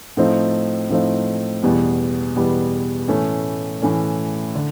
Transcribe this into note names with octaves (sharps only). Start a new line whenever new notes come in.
A2 F3 A3 C4 D#4
A2 F3 A3 C4 D#4
E2 B2 G3 B3
E2 B2 G3 B3
A2 E3 A3 C#4
A2 E3 A3 C#4
D3